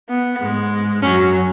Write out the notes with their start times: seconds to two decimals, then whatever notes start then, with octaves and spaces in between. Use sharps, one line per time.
0.09 B3
0.40 G#2 G#3
1.02 F#2 F#3 C#4